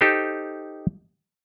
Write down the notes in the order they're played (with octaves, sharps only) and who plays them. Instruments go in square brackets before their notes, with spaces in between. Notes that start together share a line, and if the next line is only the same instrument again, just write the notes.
[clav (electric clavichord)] D#4 G4 A4 C5